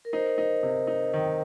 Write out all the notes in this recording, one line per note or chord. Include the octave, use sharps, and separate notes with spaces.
A#4
D#4 C5
D#4
C3
D#4
D#3